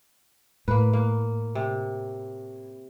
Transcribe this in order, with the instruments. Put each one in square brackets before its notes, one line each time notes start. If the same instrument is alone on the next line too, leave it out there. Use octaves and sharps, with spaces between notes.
[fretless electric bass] A2 [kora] A#3 B4
[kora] A#3
C3